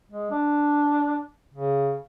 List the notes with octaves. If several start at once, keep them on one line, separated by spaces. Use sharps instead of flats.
G#3
D4
C#3